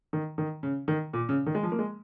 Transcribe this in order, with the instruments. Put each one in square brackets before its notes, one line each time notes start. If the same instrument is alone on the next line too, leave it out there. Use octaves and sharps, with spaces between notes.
[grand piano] D#3
D#3
C#3
D#3
A#2
C#3
D#3
G#3
F3
A#3
G#3